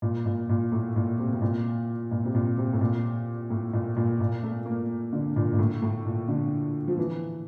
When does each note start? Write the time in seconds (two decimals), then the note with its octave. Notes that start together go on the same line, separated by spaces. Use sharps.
0.02 A#2
0.26 A#2
0.49 A#2
0.72 A2
0.96 A#2
1.19 C3
1.33 C3
1.42 A#2
2.11 A#2
2.25 C3
2.35 A#2
2.58 C3
2.73 A2
2.81 A#2
3.50 A2
3.73 A#2
3.97 A#2
4.20 A#2
4.43 A3
4.65 A#3
5.13 D3
5.36 A#2
5.53 A#2
5.59 A2
5.82 A2
6.06 A#2
6.28 D3
6.88 F3
6.98 E3